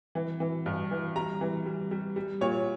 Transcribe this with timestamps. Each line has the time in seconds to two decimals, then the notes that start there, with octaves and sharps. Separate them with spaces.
0.15 E3
0.40 E3
0.66 G2
0.91 E3
1.15 G3 A#5
1.41 E3
1.66 G3
1.91 G3
2.16 G3
2.41 A#2 C#5